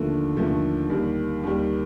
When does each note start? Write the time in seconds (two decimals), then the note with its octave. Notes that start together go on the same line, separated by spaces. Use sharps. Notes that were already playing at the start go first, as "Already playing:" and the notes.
Already playing: D#2 D3 F3 A3
0.37 D#2 D3 F3 A3
0.90 D#2 D#3 G3
1.44 D#2 D#3 G3